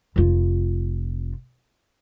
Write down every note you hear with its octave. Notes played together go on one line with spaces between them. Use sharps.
F1 F4